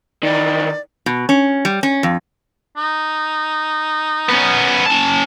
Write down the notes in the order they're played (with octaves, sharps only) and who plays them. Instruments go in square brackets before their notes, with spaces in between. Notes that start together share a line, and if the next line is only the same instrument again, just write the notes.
[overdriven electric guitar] D#3 E3 [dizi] D5
[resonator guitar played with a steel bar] B2
C#4
G3
C#4
F2
[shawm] D#4
[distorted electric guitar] B3 C#4
C#4 A5